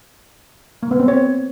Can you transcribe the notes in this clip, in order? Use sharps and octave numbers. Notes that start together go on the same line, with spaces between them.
A#3
B3
C4
C#5